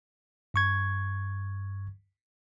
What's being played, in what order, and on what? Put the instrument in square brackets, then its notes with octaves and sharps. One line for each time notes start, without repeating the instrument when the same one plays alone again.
[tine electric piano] G2 C#6 G#6